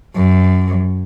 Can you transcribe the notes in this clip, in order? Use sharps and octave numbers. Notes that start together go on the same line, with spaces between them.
F#2